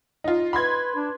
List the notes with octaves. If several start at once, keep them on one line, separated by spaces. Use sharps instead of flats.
D#4 F4
B4 B5 C6 G#6
D4